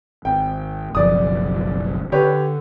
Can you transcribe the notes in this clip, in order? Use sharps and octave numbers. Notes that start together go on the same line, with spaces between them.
G#1 G5
F#1 B1 F3 D5 D#6
D3 G4 B4 C#5